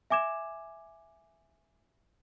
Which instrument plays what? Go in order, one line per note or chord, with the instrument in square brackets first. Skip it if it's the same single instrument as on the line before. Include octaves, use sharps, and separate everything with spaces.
[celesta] E5 G#5 D6 G#6 E7